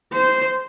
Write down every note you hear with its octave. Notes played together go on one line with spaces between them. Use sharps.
C5